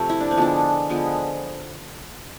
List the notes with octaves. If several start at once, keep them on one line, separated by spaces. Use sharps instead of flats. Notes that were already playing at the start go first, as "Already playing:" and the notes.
Already playing: C3 F3 A3
E4
D4
C4
D3 F3 G#3 B3 D4
D3 F3 G#3 B3